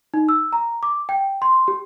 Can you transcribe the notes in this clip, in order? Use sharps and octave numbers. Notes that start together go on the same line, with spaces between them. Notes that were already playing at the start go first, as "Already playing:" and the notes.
D#4
E6
A#5
D6
G5
C6
G4